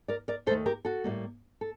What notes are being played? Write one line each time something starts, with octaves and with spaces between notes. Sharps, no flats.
A#4 D5
A#4 D5
D#2 D#3 A3 A4 C5
G4 A#4
F#4 A4
A2 G3 A#3
A4